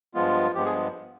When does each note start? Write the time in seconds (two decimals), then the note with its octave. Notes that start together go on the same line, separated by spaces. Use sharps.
0.14 G2 F3 G#3 B3 F4
0.55 G2 F3 G#3 B3 G4
0.65 G#4